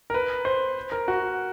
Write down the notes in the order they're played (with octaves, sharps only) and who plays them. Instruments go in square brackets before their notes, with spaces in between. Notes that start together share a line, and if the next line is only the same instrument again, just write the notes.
[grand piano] A#4
B4
C5
A#4
F#4